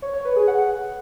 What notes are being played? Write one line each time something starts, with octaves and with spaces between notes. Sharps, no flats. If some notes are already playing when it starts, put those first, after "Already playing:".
C#5
C#5
B4
G#4
F#5